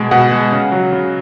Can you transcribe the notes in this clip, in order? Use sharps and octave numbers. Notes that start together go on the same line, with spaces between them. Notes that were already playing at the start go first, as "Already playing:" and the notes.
Already playing: B2 G#3
B2 F#5
G#3
C#3
F#3
C#3